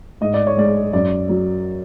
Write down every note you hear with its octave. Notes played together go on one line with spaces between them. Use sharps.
G#2 D#5
D5
C#5
G#3 D5
F#2 D5
F#3